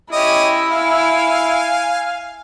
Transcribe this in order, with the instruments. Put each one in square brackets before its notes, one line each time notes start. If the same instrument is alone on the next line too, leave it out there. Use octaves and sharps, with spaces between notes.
[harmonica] C#4 G4 D#5 [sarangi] E4
[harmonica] F5 G#5